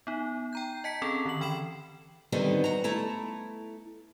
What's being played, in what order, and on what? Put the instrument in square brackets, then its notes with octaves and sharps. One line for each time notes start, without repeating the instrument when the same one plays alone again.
[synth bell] B3 D#4
G5 A#5 G6
D#5 A5 B6 C#7
C4 C#4 G#4 A4
D3 D#3 F#7
E3 G5 B5 C7 E7
[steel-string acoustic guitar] D3 D#3 G3 B3 C4 D#4
F#4 A#5
A3 E4 A5 A#5